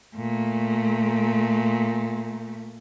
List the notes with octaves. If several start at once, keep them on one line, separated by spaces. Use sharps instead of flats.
A#2 A3